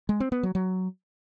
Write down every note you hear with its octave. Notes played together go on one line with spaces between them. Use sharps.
G#3
C4
B3
F#3
F#3